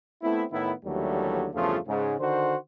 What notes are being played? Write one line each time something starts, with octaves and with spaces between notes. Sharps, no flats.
A3 B3 C4 E4
A2 D#3 B3 E4
D#2 D3 E3 F#3 G3 A3
E2 G2 C#3 F3 A3 F4
G#2 C#3
D3 D#3 F#4 C5